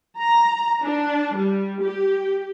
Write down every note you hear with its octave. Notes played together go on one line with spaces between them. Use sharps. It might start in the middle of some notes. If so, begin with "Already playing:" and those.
A#5
D4
G3
G4